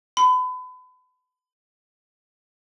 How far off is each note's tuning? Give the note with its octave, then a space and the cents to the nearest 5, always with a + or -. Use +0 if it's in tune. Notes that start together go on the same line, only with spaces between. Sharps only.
B5 +35